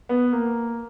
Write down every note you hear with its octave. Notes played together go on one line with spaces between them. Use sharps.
B3
A#3